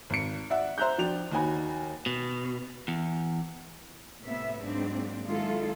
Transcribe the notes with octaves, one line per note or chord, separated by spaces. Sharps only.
G#1 C#7
D5 E5 F#5
C5 E5 A#5 F#6 G6
F3 D4 D5 G5 F7
D#2 D#4 F#4 G#5 B5
B2
E2
A2 C3 B3 E5
G#2 F#3 A#3 C4 D4
D#3 F#3 G#3 E4 F4 A4